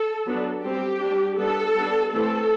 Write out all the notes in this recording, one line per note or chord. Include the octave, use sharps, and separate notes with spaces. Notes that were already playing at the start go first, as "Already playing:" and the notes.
Already playing: A4
F#3 B3 D4
G3 C4 G4
G3 D4
G3 B3 D4 A4
G3 B3 D4
E3 A3 C4 A4